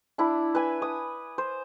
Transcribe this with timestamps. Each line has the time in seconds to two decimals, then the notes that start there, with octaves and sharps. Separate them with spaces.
0.18 D4 E4 B5
0.55 B4 E5 G#5
0.82 D#6
1.38 C5